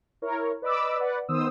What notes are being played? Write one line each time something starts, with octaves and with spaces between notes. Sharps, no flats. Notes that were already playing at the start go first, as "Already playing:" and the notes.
E4 A#4 C#5
B4 D5 D#5 B5 D6 E6
B4 D5 F#5
D#3 B3 C5 D#6 E6